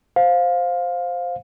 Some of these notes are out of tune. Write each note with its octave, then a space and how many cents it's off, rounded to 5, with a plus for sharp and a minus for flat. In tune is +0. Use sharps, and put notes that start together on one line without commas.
C5 +0 F5 +15